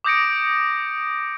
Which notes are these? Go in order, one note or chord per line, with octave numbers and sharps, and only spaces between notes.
D6 D#6 G6 A#6 C#7 D7